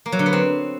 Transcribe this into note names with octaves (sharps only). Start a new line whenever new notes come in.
A#3
F#3
D3
B3
C4